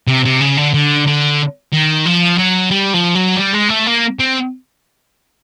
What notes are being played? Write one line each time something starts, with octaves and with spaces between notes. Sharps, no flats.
C3
C3
C#3
D3
D3
D3
D#3
F3
F#3
G3
F3
F#3
G3
G#3
A3
A#3
C4